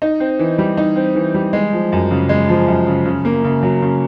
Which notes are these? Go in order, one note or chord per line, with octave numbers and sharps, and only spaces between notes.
D#4
C4
E3
G3
D#4
C4
E3
G3
G#3
F3
F#2
C#3
G#3
F3
F#2
C#3
C#3
A#3
C#3
F#3
C#3